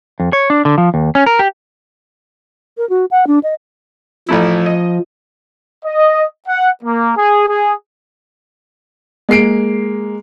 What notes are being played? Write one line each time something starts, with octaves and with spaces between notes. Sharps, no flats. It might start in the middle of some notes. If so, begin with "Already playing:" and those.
F2
C#5
D4
D3
F3
D#2
C#4
A#4
G4
A#4
F#4
F#5
D4
D#5
A1 F3 A3 E4
D#5
D#5
F#5
A#3
G#4
G#4
G#3 A#3 C7 D7